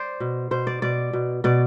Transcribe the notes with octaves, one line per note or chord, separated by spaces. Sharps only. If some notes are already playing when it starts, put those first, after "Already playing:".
Already playing: C5 D5
B2
B2 C5
D5
B2 D5
B2
B2 D5